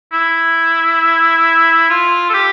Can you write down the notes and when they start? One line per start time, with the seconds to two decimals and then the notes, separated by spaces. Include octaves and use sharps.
0.13 E4
1.90 F4
2.29 A4
2.34 G4